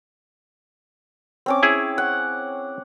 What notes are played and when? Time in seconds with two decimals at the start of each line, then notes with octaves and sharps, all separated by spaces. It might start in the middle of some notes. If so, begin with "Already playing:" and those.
1.46 C4 C#4 D6
1.63 E4 G#4
1.98 F#5